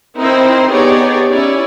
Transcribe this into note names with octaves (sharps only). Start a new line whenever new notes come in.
C4 D#4 E4 A#4 C5
B3 D#4 G4 G#4 C#5 D5
C#4 E4 C#5 D5